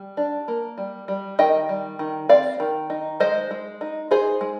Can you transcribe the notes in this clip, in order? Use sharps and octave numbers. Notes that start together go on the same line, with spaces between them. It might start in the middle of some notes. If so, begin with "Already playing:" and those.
Already playing: G3
D4
A#3
G3
G3
D#3 D#5 G5
G3
D#3
C4 D5 F5
D#3
D#4
G#3 C5 D#5
G#3
D#4
D#4 G#4 C5
G#3